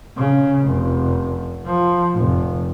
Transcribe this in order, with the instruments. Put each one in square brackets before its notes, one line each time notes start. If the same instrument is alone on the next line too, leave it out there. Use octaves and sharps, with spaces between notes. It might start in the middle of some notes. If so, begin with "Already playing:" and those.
[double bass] C#3
F1
F3
F1